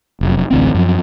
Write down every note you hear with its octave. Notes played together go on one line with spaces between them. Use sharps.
F1 F#2
A1 D2 C4
F#2 F3